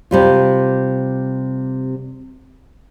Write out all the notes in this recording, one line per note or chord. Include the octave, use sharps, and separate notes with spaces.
C3 G3 F4